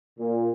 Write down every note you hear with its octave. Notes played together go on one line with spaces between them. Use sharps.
A#2